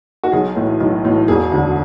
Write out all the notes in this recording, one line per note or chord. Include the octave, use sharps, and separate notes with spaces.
F#4
B1 G#4
A2 E3
B1
A2 E3
E1 G#4
D2 D3